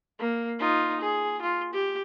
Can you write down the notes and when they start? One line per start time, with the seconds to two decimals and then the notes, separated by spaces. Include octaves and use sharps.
0.19 A#3
0.59 D#4 F4
1.01 G#4
1.42 F4
1.73 G4